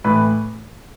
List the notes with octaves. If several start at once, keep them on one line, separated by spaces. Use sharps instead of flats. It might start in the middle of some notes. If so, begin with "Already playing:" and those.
A2 E3 B4